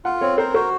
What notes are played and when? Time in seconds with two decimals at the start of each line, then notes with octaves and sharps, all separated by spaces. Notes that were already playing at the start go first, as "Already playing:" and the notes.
0.05 F4 F#5
0.21 C4 C#5
0.38 A#4 C5
0.54 F#4 C5